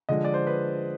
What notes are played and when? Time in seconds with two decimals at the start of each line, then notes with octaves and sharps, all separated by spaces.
0.09 D3 F3 G#3 D#5
0.25 D5
0.34 C5
0.47 B4